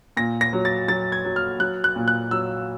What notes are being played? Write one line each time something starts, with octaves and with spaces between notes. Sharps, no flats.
A#2 A#6
A#6
F#3
A6
F#3 A6
G#6
F#3
F6
F#3 F#6
F#6
A#2
F#6
F#3 E6